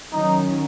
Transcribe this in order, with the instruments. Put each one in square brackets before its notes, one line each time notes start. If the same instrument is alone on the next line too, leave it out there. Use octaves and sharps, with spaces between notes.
[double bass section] D#3 F#3 C#4 [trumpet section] D#4